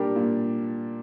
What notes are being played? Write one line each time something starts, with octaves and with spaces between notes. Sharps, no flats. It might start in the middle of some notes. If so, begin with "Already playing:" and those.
Already playing: A#2 G3 D4 G4 A#4
A#2